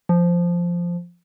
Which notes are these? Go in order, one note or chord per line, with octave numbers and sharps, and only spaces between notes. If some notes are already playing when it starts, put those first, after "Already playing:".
F3